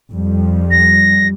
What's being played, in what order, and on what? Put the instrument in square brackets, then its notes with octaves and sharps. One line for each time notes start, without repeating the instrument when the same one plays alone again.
[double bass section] F2 G3
[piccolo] A#6